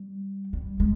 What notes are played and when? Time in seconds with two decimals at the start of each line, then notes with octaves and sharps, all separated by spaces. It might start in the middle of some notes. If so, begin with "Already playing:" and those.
Already playing: G3
0.53 G3
0.80 G#3